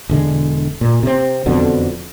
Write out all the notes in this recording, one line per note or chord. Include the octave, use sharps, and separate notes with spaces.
E1 D3 G#3
A#2
C3 C4
E1 F2 B2 D3